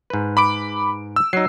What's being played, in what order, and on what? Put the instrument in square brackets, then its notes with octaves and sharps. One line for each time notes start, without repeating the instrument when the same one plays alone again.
[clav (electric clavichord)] G#2 B4
[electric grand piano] B5 D6 D7
E6
[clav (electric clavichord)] F#3 D#4 [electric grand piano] C7